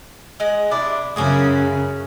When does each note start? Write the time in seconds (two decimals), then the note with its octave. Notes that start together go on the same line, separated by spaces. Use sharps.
0.40 G#3 D#5 F#5
0.71 C3 D4 E4
1.16 F#2 C#3 C#4 F#4 G#4